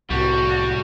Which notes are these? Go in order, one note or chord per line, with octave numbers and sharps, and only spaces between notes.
C2 A2 C3 G3 F#4